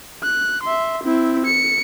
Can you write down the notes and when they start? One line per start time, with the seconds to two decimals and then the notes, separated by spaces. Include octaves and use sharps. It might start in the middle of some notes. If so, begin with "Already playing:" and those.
0.24 F#6
0.63 E5 C6
1.04 C4 E4
1.46 C#7